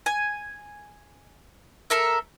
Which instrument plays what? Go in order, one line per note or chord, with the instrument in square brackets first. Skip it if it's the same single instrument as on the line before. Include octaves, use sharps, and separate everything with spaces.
[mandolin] G#5
A4 A#4 E5